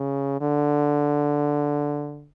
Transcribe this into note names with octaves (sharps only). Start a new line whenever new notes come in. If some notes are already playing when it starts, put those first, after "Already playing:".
Already playing: C#3
D3